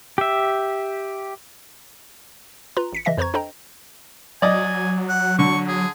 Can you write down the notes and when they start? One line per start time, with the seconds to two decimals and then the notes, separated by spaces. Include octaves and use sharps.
0.18 G4 E5
2.77 F4 B4 A#5 C6
2.93 A1 B6 C#7
3.05 C#3 E3 D#5 E5 A#6 B6
3.17 F2 B4 C5 A#5 C#6 G#6
3.34 D4 A4 C5 D#5 G5 A#5
4.42 F#3 D5 D#5 G#5
5.09 F#5
5.39 D3 C#6
5.68 G#4